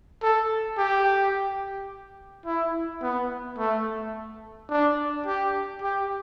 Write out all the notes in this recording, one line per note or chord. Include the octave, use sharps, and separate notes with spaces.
A4
G4
E4
B3
A3
D4
G4
G4